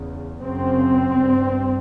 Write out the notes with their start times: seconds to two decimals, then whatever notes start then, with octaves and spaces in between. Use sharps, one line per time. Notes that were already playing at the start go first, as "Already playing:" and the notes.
Already playing: E2 C#3
0.43 F#2 C#3 C4
1.20 G2